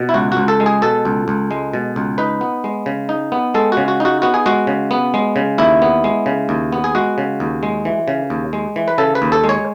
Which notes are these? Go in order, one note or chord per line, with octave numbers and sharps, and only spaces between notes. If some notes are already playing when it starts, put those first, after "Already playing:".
Already playing: B2
E4
C#2 F#4
F#4
C#2
A4
G#3
G#4
B2 A4
C#2
C#2
G#3
B2
C#2
D#4 B4
B3
G#3
C#3
D#4
B3
G#3 A4
F#4
C#3
F#4
D#4 F#4
B3 F#4
G#4
G#3 F#4
C#3
B3
G#3
C#3
D#2 E4
B3
G#3
C#3
D#2
B3
G#4
G#3 F#4
C#3
D#2
G#3
E3
C#3
D#2
G#3
E3
B4
C#3 A4
B4
D#2
A4
G#3
C#5